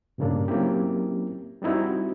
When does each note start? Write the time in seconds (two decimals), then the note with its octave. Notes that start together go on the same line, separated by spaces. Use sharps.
0.18 G2 A#2 C#3 G3 A#3 D4
0.48 F#3 A#3 C4 C#4 E4 G4
1.62 G3 C4 D#4 E4 F#4